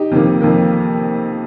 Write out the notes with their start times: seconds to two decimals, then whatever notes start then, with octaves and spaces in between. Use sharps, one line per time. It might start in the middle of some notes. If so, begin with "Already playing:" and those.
Already playing: D#4 G4
0.11 F2 C3 D#3 A#3
0.41 F2 C3 D#3 A#3